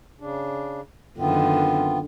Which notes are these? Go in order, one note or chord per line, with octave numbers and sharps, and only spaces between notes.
C#3 D4
F#2 D3 D#3 B3 C4 F4